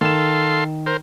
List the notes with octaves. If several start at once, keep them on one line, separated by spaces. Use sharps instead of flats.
D#3 A4 F5 C6 E7
A#4 C5